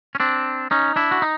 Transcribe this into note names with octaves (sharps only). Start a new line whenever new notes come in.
C#4
C4 D4
C#4 D#4
D4 E4
F#4
D#4